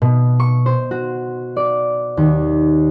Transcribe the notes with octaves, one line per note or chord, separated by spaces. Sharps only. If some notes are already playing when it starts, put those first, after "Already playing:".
B2
C#6
C5
F#4
D5
D#2